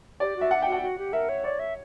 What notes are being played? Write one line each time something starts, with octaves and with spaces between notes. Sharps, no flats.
G4 D5
F#4
E5
F#5
G5
F#4
F#5
F#4
G4
A#4 E5
C#5
C#5 D5
E5